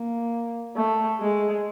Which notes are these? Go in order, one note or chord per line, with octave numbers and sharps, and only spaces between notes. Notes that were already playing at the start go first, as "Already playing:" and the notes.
Already playing: A#3
A3
G#3